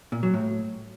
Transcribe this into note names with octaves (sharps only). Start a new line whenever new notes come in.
A#2
F#3
A2